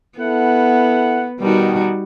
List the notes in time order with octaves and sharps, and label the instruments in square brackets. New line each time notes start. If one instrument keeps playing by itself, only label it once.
[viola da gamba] B3 [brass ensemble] E4 A4 F#5
[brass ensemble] B2 D#3 [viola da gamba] G3 D#4 F#4